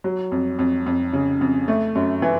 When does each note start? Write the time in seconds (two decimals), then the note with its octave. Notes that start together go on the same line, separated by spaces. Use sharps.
0.04 F#3
0.32 F2
0.59 F2
0.86 F2
1.13 C#3
1.41 F2
1.68 A3
1.95 F#2
2.22 E3